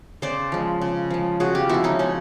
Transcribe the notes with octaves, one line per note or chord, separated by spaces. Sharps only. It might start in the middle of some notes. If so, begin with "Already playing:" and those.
C#3 C5 D5
F3 G#3
C#3
F3 G#3
C#3 F#4 G#4
F4 G4
F3 G#3 E4 F#4
C#4 D#4
C#3 C#4